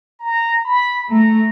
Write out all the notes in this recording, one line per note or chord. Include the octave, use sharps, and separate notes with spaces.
A#5
B5
A3 A#5